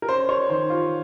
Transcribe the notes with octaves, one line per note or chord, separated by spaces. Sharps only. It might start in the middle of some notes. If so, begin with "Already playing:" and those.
A#4
C#4 C5
C#5
D#3 C5
F4